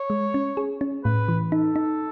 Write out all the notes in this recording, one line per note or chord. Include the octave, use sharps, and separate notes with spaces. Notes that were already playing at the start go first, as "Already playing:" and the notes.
Already playing: C#5
G#3
C#4
G#4
C#4
A2 B4
E3
D#4 A4
D#4